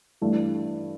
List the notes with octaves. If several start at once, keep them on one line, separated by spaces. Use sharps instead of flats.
G2 E3 A3